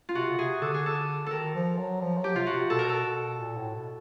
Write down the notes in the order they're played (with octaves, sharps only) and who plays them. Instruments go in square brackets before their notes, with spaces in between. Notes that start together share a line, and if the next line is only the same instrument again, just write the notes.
[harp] F4
[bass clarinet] C3 [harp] F#4
[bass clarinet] C#3
[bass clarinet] C3 [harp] G#4
[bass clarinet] D3 [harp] A4
[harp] G#4
A4
[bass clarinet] D#3 [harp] A4 A#4
[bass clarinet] F3
F#3
F3
F#3
[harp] G4
[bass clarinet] C3 [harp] F4
[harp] F#4
[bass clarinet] C3
[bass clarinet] B2 [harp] A4
[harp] A#4
A4
[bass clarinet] B2
A#2
A2
B2